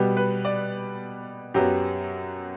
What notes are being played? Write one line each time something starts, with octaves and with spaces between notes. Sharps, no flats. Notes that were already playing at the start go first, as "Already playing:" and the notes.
Already playing: B2 G3 B3 G4
B4
D5
F#2 F#3 B3 G4